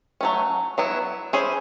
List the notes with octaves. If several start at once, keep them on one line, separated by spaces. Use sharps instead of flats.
F#3 A3 C#4
F#3 B3 E4
C#4 E4 G#4 C5